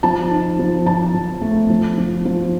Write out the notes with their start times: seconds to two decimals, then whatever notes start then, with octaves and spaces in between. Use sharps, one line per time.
0.03 F3 A5
0.31 D#4
0.59 F3
0.86 F3 A5
1.14 F3
1.41 A3
1.70 F3
1.98 F3
2.25 F3